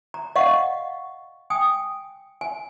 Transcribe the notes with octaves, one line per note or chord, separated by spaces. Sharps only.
A#5
D#5 F5 F#5 C#6
G5 G#5 D#6
G#5